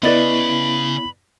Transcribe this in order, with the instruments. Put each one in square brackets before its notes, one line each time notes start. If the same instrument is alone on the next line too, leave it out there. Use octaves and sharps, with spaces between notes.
[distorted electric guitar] C#3 [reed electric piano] B3 E4 [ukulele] B4 D5 D#5 [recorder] B5